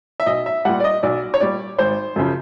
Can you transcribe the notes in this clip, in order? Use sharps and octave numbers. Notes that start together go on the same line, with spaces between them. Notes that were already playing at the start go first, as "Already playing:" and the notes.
E5
B1 D#5
E5
A#2 G3 F#5
D5
D#5
B1 D5
C#5
A#2 G3 D5
G#1 C5
F#2 C#3 F3